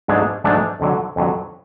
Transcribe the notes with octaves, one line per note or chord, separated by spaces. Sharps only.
G#2 F#3 A3 D4 G#4
G#2 F#3 A3 D4 G#4
F2 D3 F#3
F2 D3 F#3